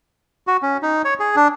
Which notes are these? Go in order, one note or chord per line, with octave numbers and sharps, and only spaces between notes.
F#4
C#4
D#4
C#5
G#4
D4